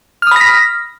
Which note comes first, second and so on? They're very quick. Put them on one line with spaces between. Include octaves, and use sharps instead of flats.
F6 D#6 B5 A#6 B6